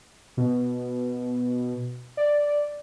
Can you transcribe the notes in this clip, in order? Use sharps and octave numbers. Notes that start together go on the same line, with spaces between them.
B2
D5